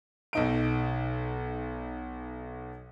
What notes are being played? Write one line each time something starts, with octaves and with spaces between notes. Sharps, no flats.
B1 D#4 D7